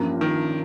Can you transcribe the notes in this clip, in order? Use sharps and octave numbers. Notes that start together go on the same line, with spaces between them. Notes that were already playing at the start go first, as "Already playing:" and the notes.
Already playing: A1 G2 F3 A#3 F4
D#3